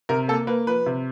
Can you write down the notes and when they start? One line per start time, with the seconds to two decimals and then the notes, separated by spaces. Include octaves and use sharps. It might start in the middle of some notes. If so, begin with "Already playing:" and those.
0.09 C3 A#4
0.28 A#3 A4
0.47 A#3 B4
0.67 F3 B4
0.86 C3